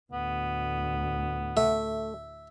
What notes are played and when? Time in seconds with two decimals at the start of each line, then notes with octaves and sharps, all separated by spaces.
0.12 D2 A2 B3
1.57 A3 E5